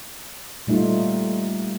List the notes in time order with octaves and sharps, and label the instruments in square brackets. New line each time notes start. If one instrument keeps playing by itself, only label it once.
[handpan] A#2 G3 A3 D#4 F4